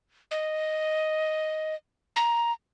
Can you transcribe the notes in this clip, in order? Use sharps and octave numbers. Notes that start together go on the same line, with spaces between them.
D#5
A#5